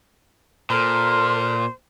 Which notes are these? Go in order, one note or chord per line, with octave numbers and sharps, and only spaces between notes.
A#2 A4 C5 F6